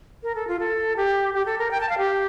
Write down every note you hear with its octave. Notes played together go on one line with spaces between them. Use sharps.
A#4
A4
F4
A4
G4
G4
A4
A#4
G5
A5
F5
G4